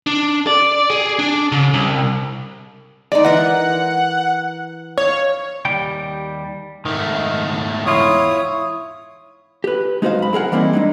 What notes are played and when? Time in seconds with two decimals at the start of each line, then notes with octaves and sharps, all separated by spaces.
0.07 D4
0.47 D5
0.90 G#4
1.19 D4
1.52 C#3
1.74 C2
3.12 G#3 D#4 D5
3.25 E3 A#4 F#5
4.98 C#5 F5
5.65 D#2 G3 G5
6.85 G#2 D#3 A3
7.86 E2 E4 F4 C#5 D#6
9.64 G4 B4
10.02 G#3 D#4 F#4 A#4 C5 F5
10.19 F#2 B5
10.33 E4 G#4 A#4 F#5
10.52 E3 G3 A#3 C4 D#4 E4
10.73 G#3 D4 D#4